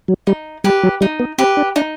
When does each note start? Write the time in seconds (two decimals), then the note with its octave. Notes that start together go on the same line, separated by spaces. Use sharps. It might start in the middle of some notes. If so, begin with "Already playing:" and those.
0.08 F#3
0.27 G3 D#4
0.64 G3 G4 B4
0.83 F#3
1.01 G3 D#4
1.20 B3
1.38 C4 G4 B4
1.57 D4
1.76 D4 D#4